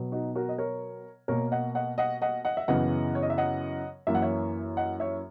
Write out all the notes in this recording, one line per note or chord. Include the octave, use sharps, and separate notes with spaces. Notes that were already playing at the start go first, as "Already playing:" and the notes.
Already playing: B2 F#3 B3
D#4 F#4
F#4 A#4
D#5
A#4 C#5
B2 A#3 A#4 C#5
D#5 F#5
D#5 F#5
D#5 F#5
D#5 F#5
D#5 F#5
E5
F#2 C#3 E3 B3 D#5 F#5
C#5
D#5
E5
D#5 F#5
F#2 E3 A#3 E5
F#5
C#5 E5
D#5 F#5
C#5 E5